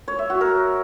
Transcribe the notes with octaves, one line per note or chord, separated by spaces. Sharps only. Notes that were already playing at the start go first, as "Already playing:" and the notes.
C#5
E5
F#4
A#4